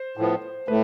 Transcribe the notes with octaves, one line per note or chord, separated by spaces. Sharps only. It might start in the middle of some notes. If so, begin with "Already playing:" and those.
Already playing: C5
A2 F3 B3
A2 B4